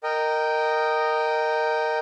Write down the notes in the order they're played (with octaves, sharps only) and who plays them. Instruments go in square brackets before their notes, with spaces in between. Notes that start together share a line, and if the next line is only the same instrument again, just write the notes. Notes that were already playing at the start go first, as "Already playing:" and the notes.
[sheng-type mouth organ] A#4 D#5 G5